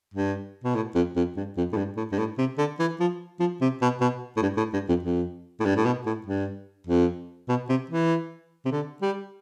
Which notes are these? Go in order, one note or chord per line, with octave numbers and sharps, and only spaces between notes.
G2
B2
A2
F2
F2
G2
F2
A2
G2
A2
G2
A2
C3
D3
E3
F3
F3
C3
B2
B2
A2
G2
A2
G2
F2
F2
A2
G2
A2
B2
A2
G2
F2
B2
C3
E3
C3
D3
G3